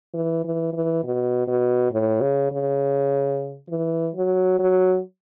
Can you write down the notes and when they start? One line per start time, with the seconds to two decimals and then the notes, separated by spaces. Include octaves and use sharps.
0.14 E3
0.44 E3
0.73 E3
1.04 B2
1.47 B2
1.92 A2
2.21 C#3
2.52 C#3
3.69 E3
4.15 F#3
4.59 F#3